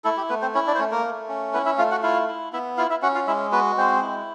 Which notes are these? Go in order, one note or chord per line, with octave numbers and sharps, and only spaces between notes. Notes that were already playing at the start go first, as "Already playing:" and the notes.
A3 E4 A4
G4
A3 B3 B4
C4 C5
C#4 E4 C#5
D4 D5
C5
A3 C#4 C#5
A#3 A#4
A3
C#4
B3 E4 B4
E4 E5
A3 F4 F5
F#4 F#5
E4 F4 F5
E4
B3 E4 E5
E4 F4 F5
E4 E5
C#4 F#4 F#5
F4 F5
G#3 E4 E5
B3 F#4 B4
G#3 C4 C5
E4